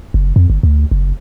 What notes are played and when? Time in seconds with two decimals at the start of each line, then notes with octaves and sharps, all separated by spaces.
0.14 F#1
0.36 F2
0.50 G1
0.63 D2
0.91 F#1